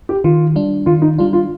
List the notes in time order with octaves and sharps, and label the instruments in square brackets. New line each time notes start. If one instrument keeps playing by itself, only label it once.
[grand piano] G4
[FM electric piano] D#3 [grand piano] F4
[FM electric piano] G3 D4
[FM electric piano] D#3 [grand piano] F4
[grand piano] D#4
[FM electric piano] G3 D4 [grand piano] F4
[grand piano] F4